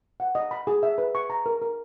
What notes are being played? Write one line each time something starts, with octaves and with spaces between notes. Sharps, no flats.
F#5
D#5
B5
G#4
E5
B4
C#6
A#5
A#4
A#4